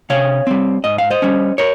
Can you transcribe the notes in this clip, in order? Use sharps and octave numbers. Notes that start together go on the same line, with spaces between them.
C3 C#5 F5
G3 C4
G#2 D#5
F5
C5 D#5
G3 C#4
A#4 C#5